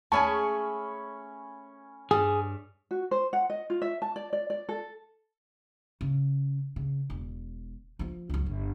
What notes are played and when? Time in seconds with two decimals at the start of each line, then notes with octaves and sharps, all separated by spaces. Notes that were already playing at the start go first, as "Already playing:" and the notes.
0.12 D#2 A3 C#4 G#4 G#5 A5 B5 C#6
2.11 G2 G#4
2.91 F#4
3.11 C5
3.33 F#5
3.50 D#5
3.70 F4
3.82 E5
4.02 A5
4.16 D5
4.33 D5
4.50 D5
4.69 A4
6.01 C#3
6.76 C#3
7.10 E1
7.99 F3 F4
8.29 C#2 F#3
8.46 G1